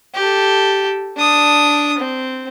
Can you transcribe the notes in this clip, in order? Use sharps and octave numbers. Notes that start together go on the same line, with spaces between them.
G4 A4
D4 D#6
C4